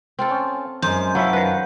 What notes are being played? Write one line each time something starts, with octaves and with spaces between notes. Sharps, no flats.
C4 F4 A4
C#4 G5
F#2 G#3 C5 G6
F3 F#3 C#4 E4 E5
D#3 F3 B4